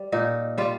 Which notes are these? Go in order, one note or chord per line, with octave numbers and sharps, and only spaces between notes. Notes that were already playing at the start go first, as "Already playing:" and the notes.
Already playing: G3
A#2 D#4
G3 F4